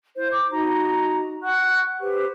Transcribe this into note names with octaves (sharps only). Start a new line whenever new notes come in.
E4 C5
D6
D#4 F#4 A#5
F#5 C#6 F#6
G4 B4 C5